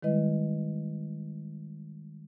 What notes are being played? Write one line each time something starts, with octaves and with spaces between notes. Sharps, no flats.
D#3 G3 G#3 E4 B4 D#5